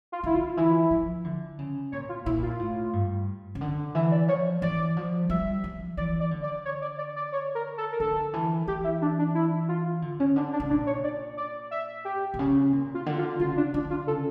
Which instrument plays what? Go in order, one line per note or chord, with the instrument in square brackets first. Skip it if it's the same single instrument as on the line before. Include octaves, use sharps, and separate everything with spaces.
[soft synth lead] F4
[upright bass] D3 [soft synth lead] E4
[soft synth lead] F4
[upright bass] E3 [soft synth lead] E4
[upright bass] F3
D3
C#3
[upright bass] A#2 [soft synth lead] C#5
[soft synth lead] F4
[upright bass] A#2 [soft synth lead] E4
[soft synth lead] F4
[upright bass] A2
G2
C#3
D3
[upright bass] E3 [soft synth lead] E5
[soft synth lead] D5
[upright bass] F3 [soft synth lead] C#5
[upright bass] E3 [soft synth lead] D5
[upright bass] F3
[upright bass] G3 [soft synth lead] E5
[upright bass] F3
[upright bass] E3 [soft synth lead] D5
[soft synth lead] D5
[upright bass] D3
[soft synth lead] D5
C#5
D5
D5
D5
C#5
A#4
A4
A#4
[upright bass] D3 [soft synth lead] A4
[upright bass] E3
[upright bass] E3 [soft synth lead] G4
[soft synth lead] E4
D4
D4
E4
F4
[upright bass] D3
[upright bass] C#3 [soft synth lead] C#4
[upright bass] D3 [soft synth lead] D4
[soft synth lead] D4
[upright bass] C#3
[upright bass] A#2 [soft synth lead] D4
[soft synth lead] C#5
D5
D5
E5
G4
[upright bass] A#2
C#3
A#2
[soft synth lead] F4
[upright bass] D3
[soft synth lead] F4
[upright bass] C#3 [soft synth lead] F4
[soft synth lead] D4
[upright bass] D3 [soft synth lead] D4
[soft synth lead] F4
[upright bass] C#3 [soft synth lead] A4